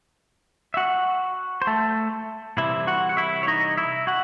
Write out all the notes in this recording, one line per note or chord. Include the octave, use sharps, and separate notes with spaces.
E5
F#4 F#5
C5
A3 A4
C2 C3 E3 E4 E5
F#4 F#5
F#5
E4 E5
C#5
D#4 D#5
E4 E5
F#4 F#5